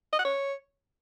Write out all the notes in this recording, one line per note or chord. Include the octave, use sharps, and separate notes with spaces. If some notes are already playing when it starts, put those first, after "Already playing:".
D#5
F#5
C#5